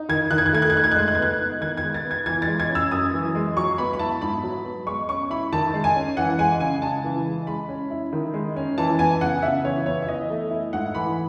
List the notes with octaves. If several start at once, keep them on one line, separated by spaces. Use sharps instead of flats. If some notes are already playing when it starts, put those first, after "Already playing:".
Already playing: D#4
D#3 G#6
D#3 F#6
G#6
F#6
A3 G#6
F#6
G#6
D#4 F#6
G#6
F#6
G#3 G#6
F#6
G#6
B3 F#6
D#4
D#3 G#6
G#6
G#3
A6
B3
G#6
E3 G#6
A6
G#3
G#6
C#4
E6
F#2 D#6
E3
G#3
F#3 C#6
B3 B5
B5
E4 A5
G#2 B5
F#3
B3
G#3 C#6
C#4 C#6
E4 B5
D#3 A5
G#3
G#5
C#4
E3 F#5
G#3 G#5
C#3 G#5
C#3 A5
E3
G#3
G#3 B5
C#4
E4
D#3
G#3
C#4
E3 A5
B3 G#5
C#3 F#5
C#3 E5
E3 C#5
B3 C#5
E5
E3 D#5
A3
E4
G#2 F#5
E3 B5